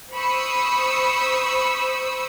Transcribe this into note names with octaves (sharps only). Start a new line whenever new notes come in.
C5 B5 C#6 D#6 E6